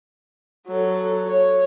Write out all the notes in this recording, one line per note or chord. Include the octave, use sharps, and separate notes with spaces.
F#3 A4
C#5